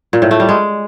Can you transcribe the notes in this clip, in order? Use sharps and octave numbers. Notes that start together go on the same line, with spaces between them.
A#2
A2
A3
G3
G#3